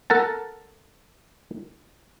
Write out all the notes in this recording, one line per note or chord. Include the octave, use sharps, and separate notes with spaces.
A4 A#4 F#5 A5